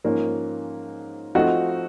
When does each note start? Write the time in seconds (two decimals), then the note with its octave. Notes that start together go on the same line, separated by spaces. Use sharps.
0.04 G#2 F3 A#3 C#4
1.35 F3 A3 C4 D#4 F#4